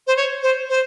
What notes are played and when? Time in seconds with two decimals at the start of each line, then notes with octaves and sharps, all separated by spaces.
0.07 C5
0.17 C#5
0.43 C5
0.69 C5